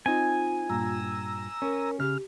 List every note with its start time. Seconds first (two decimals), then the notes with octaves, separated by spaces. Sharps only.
0.06 C4 D#4 F4 G#5
0.70 G2 A#2 A#5 E6
1.62 C#4 A#4
2.00 C#3 G4 F6